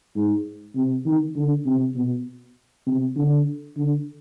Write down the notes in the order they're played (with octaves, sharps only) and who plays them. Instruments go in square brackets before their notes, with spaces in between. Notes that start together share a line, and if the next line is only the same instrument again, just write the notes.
[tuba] G#2
C3
D#3
D3
C3
B2
C3
D3
D3